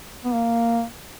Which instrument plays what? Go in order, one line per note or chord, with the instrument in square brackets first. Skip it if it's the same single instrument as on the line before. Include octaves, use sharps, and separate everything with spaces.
[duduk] B3
A#3